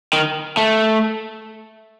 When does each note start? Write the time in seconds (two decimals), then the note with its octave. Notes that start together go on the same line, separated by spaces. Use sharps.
0.13 D#3
0.57 A3